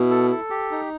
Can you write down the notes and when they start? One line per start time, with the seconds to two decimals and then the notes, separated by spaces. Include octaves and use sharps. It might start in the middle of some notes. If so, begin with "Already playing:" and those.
Already playing: B2 E4
0.11 A4
0.31 A4
0.50 G4
0.71 D#4